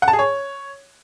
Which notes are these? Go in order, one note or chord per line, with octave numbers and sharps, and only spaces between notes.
F#5
A5
G#4
C#5